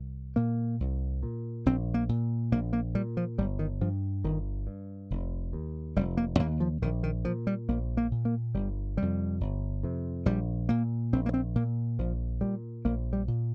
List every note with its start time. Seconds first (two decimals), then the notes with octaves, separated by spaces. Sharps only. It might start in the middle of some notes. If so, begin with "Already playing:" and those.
Already playing: C2
0.36 A#2 A#3
0.80 C2
1.23 A#2
1.66 A#1 C4
1.94 A#3
2.09 A#2
2.52 A#1 A#3
2.73 A#3
2.95 A#2 G3
3.17 F3
3.38 G1 G3
3.59 D#3
3.81 G2 F3
4.24 G1 D#3
4.67 G2
5.10 F1
5.53 D#2
5.96 F1 G3
6.17 A#3
6.39 D#2 A#3
6.60 F3
6.82 A#1 D#3
7.03 D#3
7.25 A#2 F3
7.47 G3
7.68 A#1 A#3
7.97 A#3
8.11 A#2
8.25 A#3
8.54 G1 G3
8.97 F2 C3 G3
9.40 G1
9.83 F2 C3
10.26 A#1 G3
10.69 A#2 A#3
11.13 A#1 C4
11.26 A#3
11.34 C4
11.55 A#2 A#3
11.98 A#1 F3
12.41 A#2 G3
12.85 A#1 A#3
13.13 G3
13.28 A#2